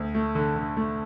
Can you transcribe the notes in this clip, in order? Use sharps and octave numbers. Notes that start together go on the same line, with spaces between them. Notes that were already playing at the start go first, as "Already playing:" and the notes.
Already playing: D2
A3
D3
D3
A3